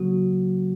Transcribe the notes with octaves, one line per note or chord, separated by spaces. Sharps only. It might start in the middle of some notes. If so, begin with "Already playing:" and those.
Already playing: C#3 F#3 A#3 F#4